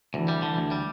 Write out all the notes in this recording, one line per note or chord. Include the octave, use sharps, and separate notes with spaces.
D2 E3
G3
D3
D2
G3